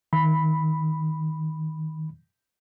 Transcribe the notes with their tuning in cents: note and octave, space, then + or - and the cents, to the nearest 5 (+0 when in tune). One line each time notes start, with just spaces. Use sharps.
D#3 +15 B5 +0